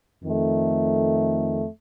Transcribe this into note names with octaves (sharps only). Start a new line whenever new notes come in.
F2 D#3 A3